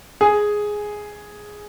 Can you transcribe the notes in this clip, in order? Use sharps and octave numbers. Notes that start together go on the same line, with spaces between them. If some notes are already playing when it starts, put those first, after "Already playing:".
G#4